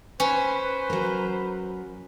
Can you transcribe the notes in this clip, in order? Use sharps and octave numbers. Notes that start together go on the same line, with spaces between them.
C#4 B4 C5
F#3 A#4